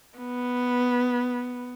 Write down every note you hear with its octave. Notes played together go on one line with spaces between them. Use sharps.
B3